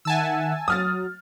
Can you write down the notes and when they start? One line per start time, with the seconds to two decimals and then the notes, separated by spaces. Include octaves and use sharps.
0.05 D#3 E5 F#5 G#5 A5 E6
0.68 F#3 D#6 F6 A6